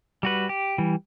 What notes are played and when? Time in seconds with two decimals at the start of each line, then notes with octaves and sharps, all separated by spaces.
0.23 G3 F#4 B4
0.49 G4
0.78 E3 G3